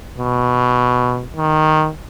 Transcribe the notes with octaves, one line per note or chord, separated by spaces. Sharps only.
B2
D#3